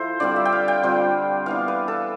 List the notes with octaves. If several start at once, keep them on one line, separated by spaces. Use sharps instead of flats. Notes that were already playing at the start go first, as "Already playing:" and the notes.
Already playing: F3 E4 A4 C5
D3 G3 C4 F4 D5
E5
G5
F5
G5
D3 G3 C4 F4
E3 B3 D4 F5
B4
A4